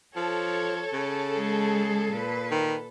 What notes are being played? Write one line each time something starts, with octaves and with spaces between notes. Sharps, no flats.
F3 A4 C#5
C#3
G#3 G#4
A#2 B4
D#3